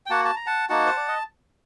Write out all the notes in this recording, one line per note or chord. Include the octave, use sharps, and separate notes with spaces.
G5
A#3 F#4 F#5 A5
A5
A#5
F#5 A5
A#3 D#4 F#4 F#5 A5
C5
D5
D#5